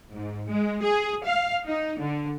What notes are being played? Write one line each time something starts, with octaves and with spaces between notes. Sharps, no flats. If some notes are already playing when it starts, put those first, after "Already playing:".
G#2
G#3
G#4
F5
D#4
D3